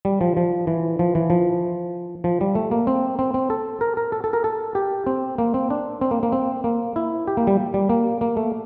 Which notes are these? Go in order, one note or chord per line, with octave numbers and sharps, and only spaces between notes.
G3
F3
F3
E3
F3
E3
F3
F3
G3
A3
A#3
C4
C4
C4
A4
A#4
A#4
A4
A4
A#4
A4
G4
C4
A#3
C4
D4
C4
A#3
A#3
C4
A#3
E4
G4
A#3
G3
G3
A#3
A#3
A3